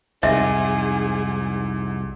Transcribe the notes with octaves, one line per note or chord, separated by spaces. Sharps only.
C2 F2 G#2 G#4 D#5 E5